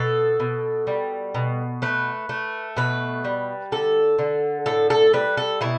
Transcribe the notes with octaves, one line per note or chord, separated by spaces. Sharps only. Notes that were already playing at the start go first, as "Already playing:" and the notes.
Already playing: B2 A4
B2
G3
B2
A3 B4
A3
B2 B4
G3
D3 A4
D3
A2 A4
A4
G3 B4
A4
B2 E4